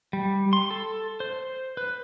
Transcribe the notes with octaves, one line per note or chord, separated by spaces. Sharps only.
G3
C6
A4
C5
B4